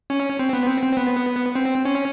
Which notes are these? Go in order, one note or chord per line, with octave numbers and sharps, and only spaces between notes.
C#4
C4
B3
C4
C4
B3
C4
C#4